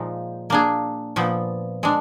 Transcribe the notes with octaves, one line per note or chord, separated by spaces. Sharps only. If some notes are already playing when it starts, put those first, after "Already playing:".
Already playing: A#2 F3 G#3 D#4
A#3 D4 G#4
A#2 F3 B3
G#3 D4